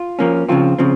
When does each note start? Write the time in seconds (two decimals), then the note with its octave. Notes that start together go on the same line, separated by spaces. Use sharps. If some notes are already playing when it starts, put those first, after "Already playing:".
Already playing: F4
0.19 F3 A#3 C#4
0.49 C#3 F3 C4 F4
0.79 C#3 F3 C4